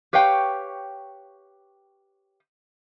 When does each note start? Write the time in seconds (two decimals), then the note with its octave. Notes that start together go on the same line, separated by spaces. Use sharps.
0.13 G4 B4 C#5 F5 G5